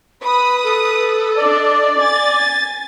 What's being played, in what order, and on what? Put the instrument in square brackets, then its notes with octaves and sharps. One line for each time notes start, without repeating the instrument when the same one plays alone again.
[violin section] B4 D#6 [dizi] B5
[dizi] A4
[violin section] D4 D#5 [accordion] D5
[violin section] G#5 A6